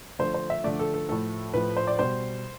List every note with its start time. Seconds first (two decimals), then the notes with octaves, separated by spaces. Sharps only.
0.19 D3 F3 A3 C5
0.34 C5
0.50 E5
0.64 D3 F3 A3 D5
0.79 A4
0.94 A4
1.09 A2 F3 A3 A4
1.54 A2 F3 A3 B4
1.77 C5
1.87 D5
1.99 B2 G3 C5